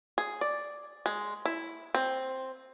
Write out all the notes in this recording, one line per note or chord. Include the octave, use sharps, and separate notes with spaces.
G#4
D5
G#3
E4
C4